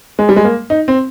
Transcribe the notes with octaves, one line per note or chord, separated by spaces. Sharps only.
G#3
G3
G#3
A#3
D#4
C4